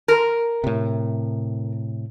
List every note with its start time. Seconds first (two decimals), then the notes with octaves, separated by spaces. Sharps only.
0.08 A#4
0.64 A2 C3